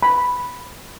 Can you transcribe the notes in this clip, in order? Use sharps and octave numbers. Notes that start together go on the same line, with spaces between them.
B5